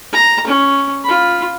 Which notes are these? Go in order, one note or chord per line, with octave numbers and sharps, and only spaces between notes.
A#5
C#4
F4 B5